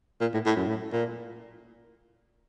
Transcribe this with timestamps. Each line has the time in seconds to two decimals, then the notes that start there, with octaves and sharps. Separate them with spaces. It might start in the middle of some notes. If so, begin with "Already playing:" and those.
0.21 A#2
0.34 A2
0.46 A2
0.56 F#2
0.67 A2
0.93 A#2